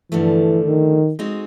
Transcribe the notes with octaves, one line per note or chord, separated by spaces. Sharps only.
G2 D3 E3 F3 A3
D#3
G#3 C4 D#4 F#4